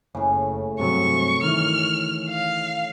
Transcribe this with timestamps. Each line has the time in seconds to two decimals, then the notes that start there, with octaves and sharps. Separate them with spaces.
0.15 F#1 A2 C#3
0.79 G2 C3 F#3 C#6
1.43 D#3 E3 F6
2.30 F5